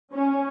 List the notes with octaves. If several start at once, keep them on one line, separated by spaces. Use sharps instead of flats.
C#4